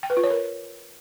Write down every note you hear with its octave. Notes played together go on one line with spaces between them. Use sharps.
G5
B4
F4
C#5
A#4